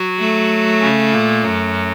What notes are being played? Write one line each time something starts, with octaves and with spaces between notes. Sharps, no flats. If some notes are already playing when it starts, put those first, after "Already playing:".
Already playing: F#3 F#4
A3
C#3 C#4
A#2 A#3
F#2 F#3